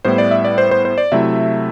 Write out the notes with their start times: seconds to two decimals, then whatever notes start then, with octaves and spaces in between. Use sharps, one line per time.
0.05 A2 G3 B3 E4 C5
0.18 D5
0.31 E5
0.45 D5
0.58 C5
0.71 C5
0.85 C5
0.98 D5
1.12 C3 F#3 A3 E4 E5